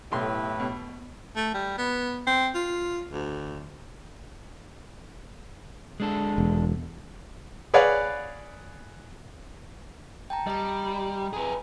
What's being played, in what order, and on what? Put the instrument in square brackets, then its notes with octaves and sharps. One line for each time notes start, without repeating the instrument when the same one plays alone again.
[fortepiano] B1 C6 [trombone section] A2 [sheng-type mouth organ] E4 G4 B4
[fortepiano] B2
[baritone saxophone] A3
G3
B3
C4
F4
D2
[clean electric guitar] G#3 D4 A4
[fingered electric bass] E1
[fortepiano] G#4 B4 C#5 D5 F5 F#5
[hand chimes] G5 A5 A#5
[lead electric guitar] G3 [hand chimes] D#5 G5 A#5
[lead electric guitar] G#4 B4